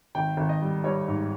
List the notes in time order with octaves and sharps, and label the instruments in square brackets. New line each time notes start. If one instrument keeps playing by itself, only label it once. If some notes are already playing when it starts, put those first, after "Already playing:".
[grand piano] G#1 G5
G#1
D#5
G3
G3 C#5
G#2